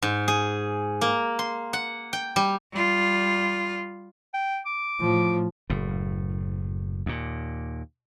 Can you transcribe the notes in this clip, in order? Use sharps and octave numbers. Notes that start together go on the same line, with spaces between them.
G#2
G#4
A#3
C6
F#5
G5
G3
G3 F4
G5
D6
A2 F3
F#1 A2
D#2 A#2